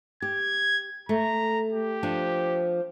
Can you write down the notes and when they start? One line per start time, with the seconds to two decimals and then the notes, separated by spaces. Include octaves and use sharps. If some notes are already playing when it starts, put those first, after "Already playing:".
0.22 G4 G#6
1.09 A3 A#5
1.72 G4
2.03 F3 D4